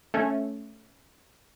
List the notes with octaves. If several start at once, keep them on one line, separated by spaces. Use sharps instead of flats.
A3 C#4